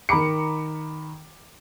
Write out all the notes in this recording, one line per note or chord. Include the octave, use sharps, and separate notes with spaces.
D#3 A#5 B5 D6 C#7